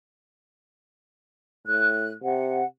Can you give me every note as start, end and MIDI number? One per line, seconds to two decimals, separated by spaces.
1.67 2.13 45
1.67 2.12 90
2.24 2.62 48
2.24 2.65 78